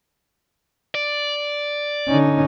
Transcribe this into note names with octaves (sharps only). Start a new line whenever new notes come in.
D5
D3 C#4 D#4